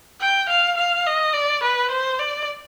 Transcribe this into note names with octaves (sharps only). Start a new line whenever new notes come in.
G5
F5
F5
D#5
D5
B4
C5
D5